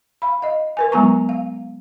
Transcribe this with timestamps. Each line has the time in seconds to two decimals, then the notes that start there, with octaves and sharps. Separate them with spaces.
0.22 F5 B5
0.42 D#5 F5
0.77 A#4 B4 G#5
0.92 F#3 G#3 B3 G#5 A#5 C#6
1.29 F5